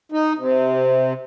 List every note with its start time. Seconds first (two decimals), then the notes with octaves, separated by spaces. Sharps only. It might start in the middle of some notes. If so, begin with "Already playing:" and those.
0.12 D#4
0.38 C3